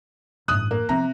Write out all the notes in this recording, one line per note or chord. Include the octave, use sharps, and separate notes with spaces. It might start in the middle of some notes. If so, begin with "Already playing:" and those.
A1 G2 D#6 F#6
A#3
C3 F3 B3 A#5